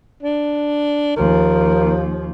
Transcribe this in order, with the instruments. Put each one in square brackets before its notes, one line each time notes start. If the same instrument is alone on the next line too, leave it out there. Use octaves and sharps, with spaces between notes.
[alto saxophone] D4
[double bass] D#2 F3 [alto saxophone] A#4